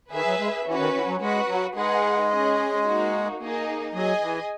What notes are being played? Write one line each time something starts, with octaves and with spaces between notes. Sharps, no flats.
D#3 G#4 B4 E5
F#3
G#3
E3 C#4 F#4 B4
D#3
E3
F#3
G#3 F#4 B4 F#5
F#3
G#3 D#4 G#4 B4 F#5
C#4 G#4 D#5
A#3 D#4 F#4
A#3 D#4 G#4 D#5
F#3 G#4 D#5 G#5
E3